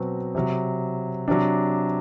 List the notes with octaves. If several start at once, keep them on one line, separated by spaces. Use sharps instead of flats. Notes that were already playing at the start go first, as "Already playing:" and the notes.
Already playing: B2 F#3 C4
C3 F#3
C3 F#3 D4